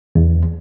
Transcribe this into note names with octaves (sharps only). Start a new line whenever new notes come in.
E2